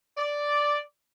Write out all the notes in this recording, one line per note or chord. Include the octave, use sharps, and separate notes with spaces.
D5